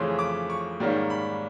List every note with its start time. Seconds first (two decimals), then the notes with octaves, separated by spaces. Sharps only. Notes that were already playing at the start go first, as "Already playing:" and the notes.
Already playing: F2 C#3 E3 A3 C#4 C6
0.19 D6
0.50 C#6
0.80 G#2 D#3 G3 A#3 C#4
1.10 B5